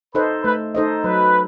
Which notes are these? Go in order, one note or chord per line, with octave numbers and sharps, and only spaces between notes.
D#4 A4 B4 C5 D#5
A3 B4
D#4 A4 C5 D#5
F#3 B4